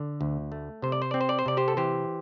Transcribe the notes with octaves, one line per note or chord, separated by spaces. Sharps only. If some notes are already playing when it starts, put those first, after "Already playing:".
Already playing: D3
D2
A3
C3 C5
D5
C5
C4 D5
C5
D5
C5
C3 D5
G4 C5
A4
E3 G4 C5